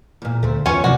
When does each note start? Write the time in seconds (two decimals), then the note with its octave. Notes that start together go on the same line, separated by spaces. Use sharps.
0.22 E2 A#2
0.43 D2 A3 C4
0.66 E2 C#4 F4 B4 C#5
0.84 F#2 C3 D#3 F3 D4 E4 F#4